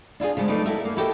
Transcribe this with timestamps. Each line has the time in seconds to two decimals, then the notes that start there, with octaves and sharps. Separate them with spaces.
0.20 D4 E4 F4 G#4
0.37 C#3 F3 G#3
0.48 F#3 A3 D#4 F4 B4 D5
0.66 E4 F#4 A4 A#4 E5
0.85 A#3
0.97 E4 F#4 G4 A4 C5 D#5